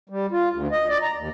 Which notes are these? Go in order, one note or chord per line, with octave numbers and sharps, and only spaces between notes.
G3
F4
D2
D#5
D5
A#5
D#2